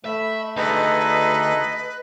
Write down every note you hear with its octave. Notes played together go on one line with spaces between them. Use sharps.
A3 E5 B5
D2 D#4 G#4 A4 B4 D#5